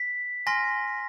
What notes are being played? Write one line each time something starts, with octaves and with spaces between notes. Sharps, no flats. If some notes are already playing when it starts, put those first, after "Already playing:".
Already playing: B6
G#5 C6 F6 A#6